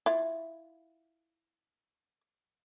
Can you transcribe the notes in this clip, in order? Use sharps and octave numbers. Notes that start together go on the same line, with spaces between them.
E4 F4